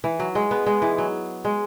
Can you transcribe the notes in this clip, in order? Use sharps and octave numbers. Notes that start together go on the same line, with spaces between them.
E3
F#3
G#3
B3
G#3
E3
F#3
G#3